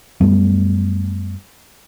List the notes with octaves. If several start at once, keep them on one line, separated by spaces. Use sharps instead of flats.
F#2 G3 A3 B3